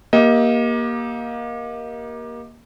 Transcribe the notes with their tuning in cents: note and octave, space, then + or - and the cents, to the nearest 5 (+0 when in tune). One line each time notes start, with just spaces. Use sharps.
A#3 +20 G4 +0 D#5 +30